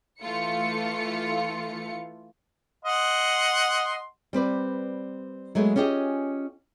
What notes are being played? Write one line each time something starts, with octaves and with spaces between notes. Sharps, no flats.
E3 A3 F4 C#7
D#5 F#5 C6
G3 C4 B4 D5
F#3 G#3 A3 B3
C#4 F4 G4 G#4 D#5